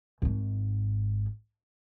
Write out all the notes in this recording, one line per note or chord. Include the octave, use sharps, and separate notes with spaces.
G#1 G#2